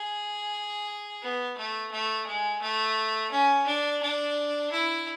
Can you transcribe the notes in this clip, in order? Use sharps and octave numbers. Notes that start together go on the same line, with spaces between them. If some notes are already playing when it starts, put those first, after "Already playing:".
Already playing: G#4
B3
A3
A3
G#3
A3
C#4
D4
D4
E4